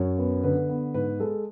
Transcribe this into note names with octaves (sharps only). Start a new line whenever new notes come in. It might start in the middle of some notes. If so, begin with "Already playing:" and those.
Already playing: F#2 C#5
B3
D3 B4
B3
G#2 B4
G#3 A4